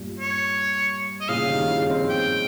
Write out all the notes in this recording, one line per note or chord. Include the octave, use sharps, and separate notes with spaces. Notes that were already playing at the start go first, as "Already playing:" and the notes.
Already playing: G2 A#2
C#5
D#5
A#2 C#3 F5
C3 D#3
C#3 F3
C4 D#4
G5